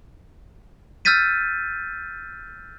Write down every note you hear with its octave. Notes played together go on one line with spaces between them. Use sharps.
E6 F6 G6 A6 B6 D#7